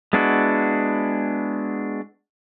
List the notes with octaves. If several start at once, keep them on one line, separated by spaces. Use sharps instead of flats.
G#3 B3 D4 E4 F#4